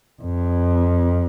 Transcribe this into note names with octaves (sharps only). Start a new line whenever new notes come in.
F2